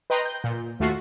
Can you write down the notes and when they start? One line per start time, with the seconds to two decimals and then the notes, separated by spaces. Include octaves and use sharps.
0.10 B4 D#5 G5 A#5 C6
0.26 G6
0.44 A#2
0.80 D#2 A3 F4 F#4 C7